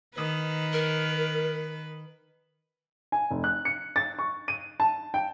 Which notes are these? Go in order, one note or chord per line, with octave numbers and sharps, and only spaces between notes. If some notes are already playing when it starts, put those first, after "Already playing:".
D#3 B4
A#4
G#5
F1
F#6
C#7
A6
C#6
D#7
A5
G5